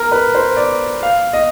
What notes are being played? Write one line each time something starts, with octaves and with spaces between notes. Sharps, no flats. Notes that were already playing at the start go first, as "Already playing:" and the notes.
Already playing: A#4
B4
C5
D5
F5
D#5